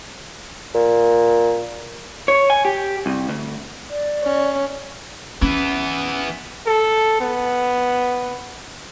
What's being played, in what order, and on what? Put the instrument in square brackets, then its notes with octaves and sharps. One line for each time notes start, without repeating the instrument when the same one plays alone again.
[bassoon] A#2
[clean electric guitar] C#5
G#5
G4
C2
D2
[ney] D5
[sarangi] C#4
[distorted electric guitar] E3 B3 [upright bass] C#4
[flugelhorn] A4
B3